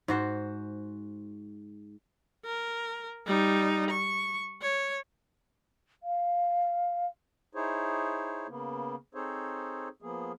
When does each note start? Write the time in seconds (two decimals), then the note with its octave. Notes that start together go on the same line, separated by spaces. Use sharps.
0.08 G#2 F#4 C5
2.45 A#4
3.27 G3 D#4
3.90 C#6
4.62 C#5
6.03 F5
7.55 D#4 E4 G#4 C5 C#5
8.48 C#3 A#3 B3
9.15 C4 D#4 G#4 A4 C5 C#5
10.02 F3 A#3 B3 G#4